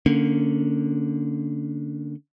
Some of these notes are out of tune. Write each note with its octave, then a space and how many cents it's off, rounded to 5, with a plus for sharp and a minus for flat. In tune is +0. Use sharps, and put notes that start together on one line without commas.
D3 +0 A#3 -20 C#4 +0